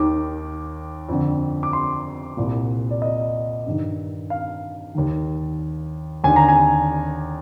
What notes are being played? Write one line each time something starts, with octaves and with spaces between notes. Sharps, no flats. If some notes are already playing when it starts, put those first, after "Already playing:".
Already playing: D#2 D#3 D6
F2 D3
D6
C6
C2 A#2
D5
D#5
G2 D#3
F5
D#2 D#3
D#2 D3 G#5
A#5
G#5